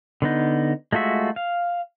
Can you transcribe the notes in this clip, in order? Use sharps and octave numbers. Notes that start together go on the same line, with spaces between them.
D3 B3 D#4
G#3 A3 F4 F#4 E5
F5